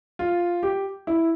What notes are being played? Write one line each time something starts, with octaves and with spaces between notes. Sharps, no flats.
F4
G4
E4